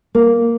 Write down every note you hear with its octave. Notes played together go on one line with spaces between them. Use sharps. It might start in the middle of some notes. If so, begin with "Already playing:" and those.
A#3